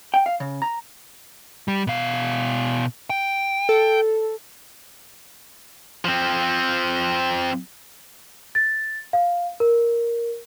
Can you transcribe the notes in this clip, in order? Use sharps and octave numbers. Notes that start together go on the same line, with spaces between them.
G5
F5
C#3
A#5
G3
B2 F5
G5
A4
F3 C4
A6
F5
A#4